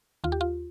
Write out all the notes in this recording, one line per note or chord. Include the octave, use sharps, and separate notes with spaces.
D#2 F4
G4
F4